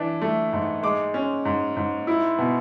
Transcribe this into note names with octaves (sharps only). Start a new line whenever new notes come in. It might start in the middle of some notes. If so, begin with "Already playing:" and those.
Already playing: E3 D4
A3
G#2
G#3 D6
C#4
G#2
G#2
E4
B2